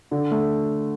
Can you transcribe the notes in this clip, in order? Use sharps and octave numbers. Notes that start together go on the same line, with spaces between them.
D3
A3